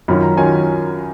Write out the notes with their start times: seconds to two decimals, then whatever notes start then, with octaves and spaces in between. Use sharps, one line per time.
0.08 F#2 D#3 F#3 C#4 F4 B5
0.23 A#5
0.37 D#3 F#3 C#4 F4 G#5